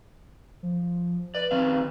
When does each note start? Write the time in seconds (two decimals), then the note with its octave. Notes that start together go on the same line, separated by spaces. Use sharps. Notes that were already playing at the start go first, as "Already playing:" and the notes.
0.63 F3
1.35 B4 D5
1.51 D#3 C4 F5